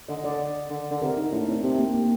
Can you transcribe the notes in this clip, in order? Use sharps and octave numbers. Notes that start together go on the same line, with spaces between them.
D3 D#5
D3 D5
D3
D3
C3 A#4
D#4
A2 D4
A2 C4
C3 C4
A#3
A#3